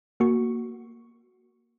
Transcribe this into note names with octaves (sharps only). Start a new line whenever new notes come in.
A#3 F#4 C#6